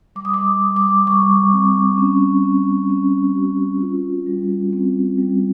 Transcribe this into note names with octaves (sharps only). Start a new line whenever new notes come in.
G3 D6
D#6
D6
G3
D6
G3 C#6
C4
C#4
C#4
C#4
F#4
F4
G3
C4
G3